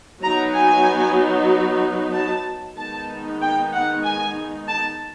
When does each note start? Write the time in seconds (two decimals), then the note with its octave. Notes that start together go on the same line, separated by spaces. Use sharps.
0.23 F#3 B3 D#4 A#5
0.55 G#5
2.13 A5
2.77 D#3 G#3 B3 D#4 A5
3.41 G5
3.73 F#5
4.04 G#5
4.68 A5